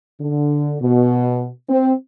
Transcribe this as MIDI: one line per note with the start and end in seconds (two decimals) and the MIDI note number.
0.21 0.76 50
0.82 1.48 47
1.69 1.92 60